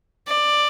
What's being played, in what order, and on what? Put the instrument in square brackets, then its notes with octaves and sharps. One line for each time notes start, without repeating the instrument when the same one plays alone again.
[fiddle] D5